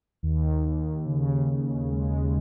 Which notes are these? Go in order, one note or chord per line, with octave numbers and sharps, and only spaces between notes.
D#2
D#2
C#3
D#2
G#3